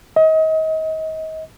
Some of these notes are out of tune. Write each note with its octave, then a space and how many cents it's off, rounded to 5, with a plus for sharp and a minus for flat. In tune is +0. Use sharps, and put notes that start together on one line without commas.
D#5 +35